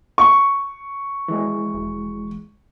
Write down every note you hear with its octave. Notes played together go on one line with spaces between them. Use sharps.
C#6
E3 G#3
E1